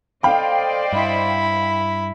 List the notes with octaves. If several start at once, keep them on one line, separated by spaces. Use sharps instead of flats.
A4 C5 D5 D#5 F5 G5 B5
G2 E4 B5